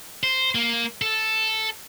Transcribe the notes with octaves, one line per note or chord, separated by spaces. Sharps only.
C5
A#3
A4